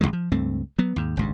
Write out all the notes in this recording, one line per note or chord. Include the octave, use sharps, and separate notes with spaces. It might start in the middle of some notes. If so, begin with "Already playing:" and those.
A1 B2 D3 G#3
F3
C#2 G2 A3 C4
F#3 B3
D#2 G#2
G#1 C#2 G2